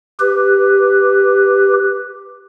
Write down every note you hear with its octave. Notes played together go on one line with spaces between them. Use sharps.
G4 B4